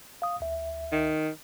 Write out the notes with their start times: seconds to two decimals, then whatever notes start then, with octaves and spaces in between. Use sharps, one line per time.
0.22 F5 D#6
0.40 D2 E5
0.92 D#3